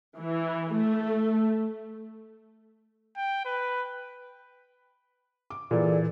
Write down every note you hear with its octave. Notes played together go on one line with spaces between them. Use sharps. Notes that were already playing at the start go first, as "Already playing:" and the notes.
E3
A3
G5
B4
D6
A#2 E3 G#4 A4 D5